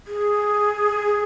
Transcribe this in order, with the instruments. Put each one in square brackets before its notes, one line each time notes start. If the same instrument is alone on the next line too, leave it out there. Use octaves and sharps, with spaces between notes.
[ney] G#4